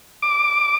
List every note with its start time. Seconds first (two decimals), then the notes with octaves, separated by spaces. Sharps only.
0.22 D6